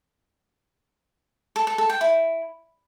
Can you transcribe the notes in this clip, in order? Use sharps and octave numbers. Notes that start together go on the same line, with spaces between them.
A4
A4
A4
G5
E4